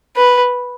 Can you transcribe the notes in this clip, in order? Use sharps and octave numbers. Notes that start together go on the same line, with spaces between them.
B4